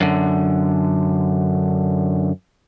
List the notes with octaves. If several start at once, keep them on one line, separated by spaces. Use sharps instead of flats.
F#2 D3